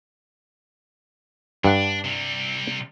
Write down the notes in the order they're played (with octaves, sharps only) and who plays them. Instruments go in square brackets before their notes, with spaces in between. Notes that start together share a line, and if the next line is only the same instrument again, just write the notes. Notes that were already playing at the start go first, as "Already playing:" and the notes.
[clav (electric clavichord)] G2 F#5 [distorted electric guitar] D4
[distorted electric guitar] C3 G3